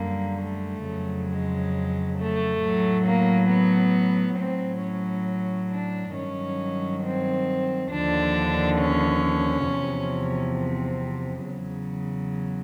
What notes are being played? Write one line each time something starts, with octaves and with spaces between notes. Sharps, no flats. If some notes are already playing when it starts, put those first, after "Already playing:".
Already playing: F#2 D3 G3 A#3
A3
F2 C#3 F#3
G#3
A3
A2 F#3
A#3
B3
A2 F#3 C4
C#4
D4
G2 D#3 F#3 C#4
C4
D#2 D3 F3 D4
C#4
E2 C3 F3
C4
E2 C#3 F#3